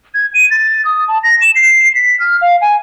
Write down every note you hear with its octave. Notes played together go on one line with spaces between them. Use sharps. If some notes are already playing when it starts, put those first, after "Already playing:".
G#6
D#7
A6
D#6
A5
A#6
E7
C7
B6
F6
F5
G#5